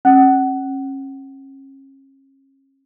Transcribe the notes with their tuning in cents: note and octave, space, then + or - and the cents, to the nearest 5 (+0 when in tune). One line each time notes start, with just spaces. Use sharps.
C#4 -35